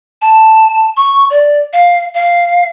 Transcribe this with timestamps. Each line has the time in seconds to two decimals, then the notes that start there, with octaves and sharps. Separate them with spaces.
0.22 A5
0.97 C#6
1.30 D5
1.73 F5
2.14 F5